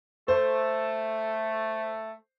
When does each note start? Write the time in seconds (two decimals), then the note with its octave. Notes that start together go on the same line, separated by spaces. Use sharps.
0.28 A3 C5